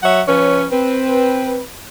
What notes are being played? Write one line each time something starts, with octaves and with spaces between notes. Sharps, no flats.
F#3 C#5 E5 F#5
F3 C#4 B4 C#5
C4 B4